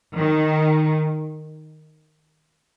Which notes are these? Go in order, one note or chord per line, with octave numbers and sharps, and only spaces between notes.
D#3